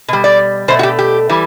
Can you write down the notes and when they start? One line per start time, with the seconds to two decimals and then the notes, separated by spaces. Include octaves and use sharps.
0.08 B2 G3
0.24 D5
0.68 B2 A3 C5
0.79 F#4
0.83 G4
0.99 G4
1.29 E3 G3